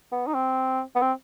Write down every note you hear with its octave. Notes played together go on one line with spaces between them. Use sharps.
B3
D#4
C4
B3
C4